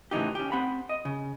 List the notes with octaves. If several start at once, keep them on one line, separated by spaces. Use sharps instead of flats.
A2 C#3 E3 D#4 G4
C#4 G4
C4 F#5 B5
D#5
C#3